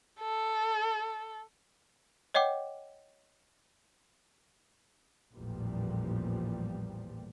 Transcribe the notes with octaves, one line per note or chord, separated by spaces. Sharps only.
A4
C#5 D#5 F#5 G5 D6
A1 E2 A#2 F3 G3